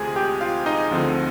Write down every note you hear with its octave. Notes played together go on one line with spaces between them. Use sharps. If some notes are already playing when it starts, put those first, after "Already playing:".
Already playing: D2 C3 F3 G#3 G#4 G#5
G4 G5
F4 F5
D#4 D#5
D2 D3 F3 C4